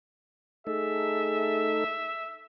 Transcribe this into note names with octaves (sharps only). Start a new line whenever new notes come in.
A3 D#4 G#4 A4 E5